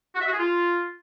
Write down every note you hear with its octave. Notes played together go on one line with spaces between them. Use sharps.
F#4
E5
F#4
G#4
F4